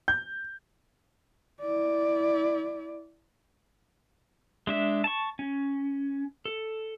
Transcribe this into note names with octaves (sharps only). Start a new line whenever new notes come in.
G6
E4 D5
G#3 D4 E5
A5 C#6
C#4
A4